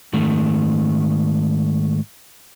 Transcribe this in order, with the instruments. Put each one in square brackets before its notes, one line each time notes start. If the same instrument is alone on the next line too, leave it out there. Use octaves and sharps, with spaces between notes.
[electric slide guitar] G#2 D#3 A3